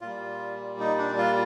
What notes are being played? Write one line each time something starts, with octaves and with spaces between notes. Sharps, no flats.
A#2 G3 F4
D#4
D4
F4